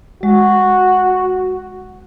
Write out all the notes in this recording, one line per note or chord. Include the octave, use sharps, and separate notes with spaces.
G#3 F#4